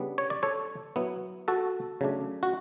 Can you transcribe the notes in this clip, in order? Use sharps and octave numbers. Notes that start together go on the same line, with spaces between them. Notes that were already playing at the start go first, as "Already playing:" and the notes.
Already playing: C#3 G3 B3 D4
C#5
D5
A4 C#5
F#3 B3 E4
F#4 A4
C#3 F#3 A3 D4
F#4